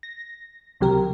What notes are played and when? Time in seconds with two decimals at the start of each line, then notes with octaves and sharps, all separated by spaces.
0.03 A#6
0.80 C#2 C3 F#3 G4 A#4